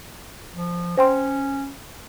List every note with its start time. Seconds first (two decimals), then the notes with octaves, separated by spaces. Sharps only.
0.54 F3
0.97 C#4 C5 G5 C6